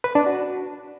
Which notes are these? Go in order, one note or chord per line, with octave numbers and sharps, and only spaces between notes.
B4
D4
F#4